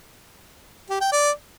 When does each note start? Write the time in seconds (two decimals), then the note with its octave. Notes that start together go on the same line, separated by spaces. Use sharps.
0.90 G4
1.01 G5
1.12 D5